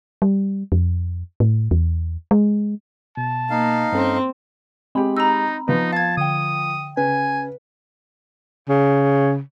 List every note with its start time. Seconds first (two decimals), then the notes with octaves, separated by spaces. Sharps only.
0.22 G3
0.72 F2
1.40 A2
1.71 E2
2.31 G#3
3.17 B2 A5
3.50 A#3 D#4 F5
3.92 G2 C4 C#4 A4
4.95 G#3 C4 G4 B5
5.17 D#4 A#5 E6
5.68 F3 B3 D#4 F4 B4
5.93 F5 A5 G#6
6.17 D3 G5 D#6
6.97 C#3 B4 G#5
8.69 C#3